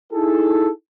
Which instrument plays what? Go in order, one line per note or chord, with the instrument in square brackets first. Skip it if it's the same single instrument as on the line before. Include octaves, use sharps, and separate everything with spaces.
[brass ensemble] D#4 E4 G#4 A4